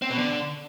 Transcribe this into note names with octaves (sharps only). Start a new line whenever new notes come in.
C4
B2
D3